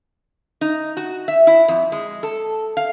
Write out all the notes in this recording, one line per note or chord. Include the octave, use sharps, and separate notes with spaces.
D#4
F#4
E5
E4
F2
G#3
A4
F5